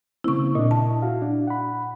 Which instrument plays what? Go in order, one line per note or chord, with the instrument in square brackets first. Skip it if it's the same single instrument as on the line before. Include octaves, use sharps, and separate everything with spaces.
[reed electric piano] C#3 A#3 C4 [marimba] E4 C#6
[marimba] A#2 [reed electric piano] D4 D#5
[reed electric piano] E4 [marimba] A5
[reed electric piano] E4 F#4 F5
D4
F#5 B5